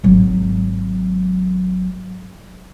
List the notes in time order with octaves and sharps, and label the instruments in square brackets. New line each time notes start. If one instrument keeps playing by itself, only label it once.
[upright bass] G#1 F#3